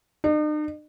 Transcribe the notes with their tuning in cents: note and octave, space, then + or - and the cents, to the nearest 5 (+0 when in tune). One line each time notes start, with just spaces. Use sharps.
D#4 -45